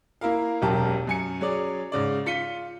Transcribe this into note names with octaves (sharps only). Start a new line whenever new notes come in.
A#3 E4 A#4 F5
E1 B1 F#2 G4 A#4 A5
F#2 G#5 C#7
F#3 C#4 G#4 D5
G#2 C#3 D5
F4 B6 C#7 D#7 G7